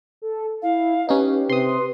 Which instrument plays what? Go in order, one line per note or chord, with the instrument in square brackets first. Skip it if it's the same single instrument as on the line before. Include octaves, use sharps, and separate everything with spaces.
[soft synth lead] A4
[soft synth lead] E4 [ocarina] F5
[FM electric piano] C#4 D#4 [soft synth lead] G4 [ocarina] B4
[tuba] C3 [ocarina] B4 [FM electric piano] C6 D#6